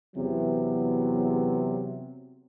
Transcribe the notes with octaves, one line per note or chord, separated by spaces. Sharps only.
E2 C3 F#3 B3